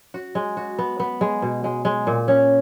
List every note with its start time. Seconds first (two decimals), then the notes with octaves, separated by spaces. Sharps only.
0.14 F#4
0.35 G#3
0.57 F#4
0.79 B3
1.00 B3
1.21 G#3
1.42 B2
1.64 G#3
1.85 G#3
2.07 A#2
2.28 C#4